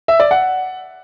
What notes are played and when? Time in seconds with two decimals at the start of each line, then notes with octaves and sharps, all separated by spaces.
0.08 E5
0.20 D5
0.31 F#5